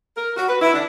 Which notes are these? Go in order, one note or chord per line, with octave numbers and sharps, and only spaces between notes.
A#4
F#4
B4
E4
D4